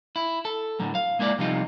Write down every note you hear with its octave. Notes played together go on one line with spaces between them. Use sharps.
E4
A4
A2 D3 F#3
F5
G#3 A#3 E4 C#5 D5
C3 F3 G3 D#4 F4